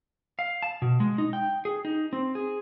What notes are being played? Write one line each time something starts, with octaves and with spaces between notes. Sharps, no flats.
F5
A5
B2
G#3
D#4
G5
G#4
D#4
C4
G#4